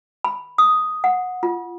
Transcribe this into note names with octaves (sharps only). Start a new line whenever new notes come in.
B5
D#6
F#5
F4